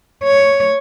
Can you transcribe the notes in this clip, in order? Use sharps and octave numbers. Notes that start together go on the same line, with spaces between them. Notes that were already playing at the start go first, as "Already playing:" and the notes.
C#5